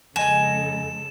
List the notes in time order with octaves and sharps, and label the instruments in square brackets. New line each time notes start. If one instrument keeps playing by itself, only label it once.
[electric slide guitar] F2 D#5 [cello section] C#3 G#3 A4 [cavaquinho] G#5 [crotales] E7